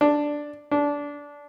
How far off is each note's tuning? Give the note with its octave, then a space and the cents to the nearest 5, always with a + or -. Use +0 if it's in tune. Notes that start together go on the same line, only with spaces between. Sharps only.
D4 +0
D4 -20